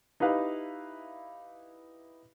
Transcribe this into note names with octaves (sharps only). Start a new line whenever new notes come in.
D#4 E4 G4 B4 F5